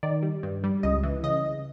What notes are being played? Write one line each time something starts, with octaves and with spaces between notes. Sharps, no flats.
D#3 D5
G3
G2
G3
C#2 D#5
E3
C#3 D#5